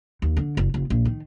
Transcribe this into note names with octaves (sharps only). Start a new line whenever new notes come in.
D#2
D3
F#1
F#1
A#1
D#3